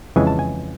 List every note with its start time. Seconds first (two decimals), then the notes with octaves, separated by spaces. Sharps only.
0.16 F2 C#3 E3 G#3 G#5
0.27 A5
0.39 G#5